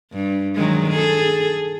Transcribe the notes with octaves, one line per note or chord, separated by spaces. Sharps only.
G2
D#3 F#3 G#3
G#4 A4